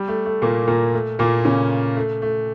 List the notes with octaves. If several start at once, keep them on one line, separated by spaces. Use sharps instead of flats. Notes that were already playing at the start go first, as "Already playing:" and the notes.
Already playing: G3
A3
A3
A#2 A#3
A#2 A#3
A3
A#2 A#3
C#3 C#4
A3
A3